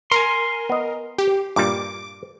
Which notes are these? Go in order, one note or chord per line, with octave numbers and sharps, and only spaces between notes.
A#4 G#5 C6
B3 D#5
G4
G2 A#2 G3 D6